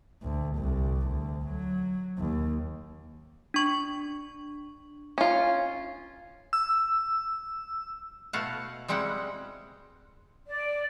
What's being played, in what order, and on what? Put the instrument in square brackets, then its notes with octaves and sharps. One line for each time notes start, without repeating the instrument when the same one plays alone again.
[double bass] D2
C2
D2
F#3
D#2
[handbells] D4 C#6
[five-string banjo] C#4 F4
[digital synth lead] E6
[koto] B2 A3 E4 F5 F#5
G3 G#3 C4 E4 F#5
[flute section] D5